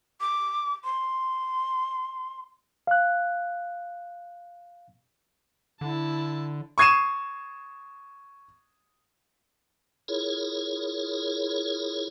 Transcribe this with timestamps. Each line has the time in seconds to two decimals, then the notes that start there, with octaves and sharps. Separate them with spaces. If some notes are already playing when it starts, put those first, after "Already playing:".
0.21 D6
0.84 C6
2.87 F5 F#6
5.81 D3 E4 A5
6.78 C#6 D#6 G#6 C7 D#7 E7
10.08 E4 F4 G#4 A#4 C#5